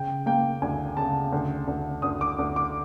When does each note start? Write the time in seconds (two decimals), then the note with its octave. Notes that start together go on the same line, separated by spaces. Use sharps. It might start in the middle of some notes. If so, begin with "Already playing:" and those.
Already playing: C#3 G5
0.26 A#3 G5
0.62 D2 G#5
0.97 C#3 A5
1.32 D2
1.68 D2
2.02 D2 D#6
2.21 D6
2.39 D2
2.56 D6